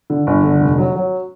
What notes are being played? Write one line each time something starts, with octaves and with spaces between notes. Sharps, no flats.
D3
G1
D3
F1
F#3
F#3